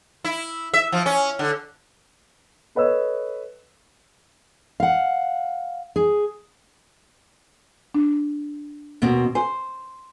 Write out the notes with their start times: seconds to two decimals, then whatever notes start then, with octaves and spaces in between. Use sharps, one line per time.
0.24 E4
0.74 E5
0.92 F3
1.06 C#4
1.39 D3
2.75 A4 B4 C#5 D#5 E6
4.80 F5 F#5
5.96 G#4
7.95 D4
9.02 D#2 B2 C4
9.35 C5 G#5